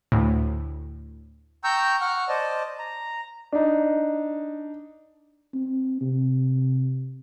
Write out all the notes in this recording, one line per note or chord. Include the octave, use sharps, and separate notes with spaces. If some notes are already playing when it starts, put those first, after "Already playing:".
D2 A2
G5 A#5 C#6 E6 G6
F#5 C#6 F6
C5 D5 D#5 A5
A#5
D4 D#4
C4
C3